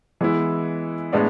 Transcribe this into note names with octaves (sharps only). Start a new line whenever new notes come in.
E3 G#3 B3 E4
A2 G#3 B3 D4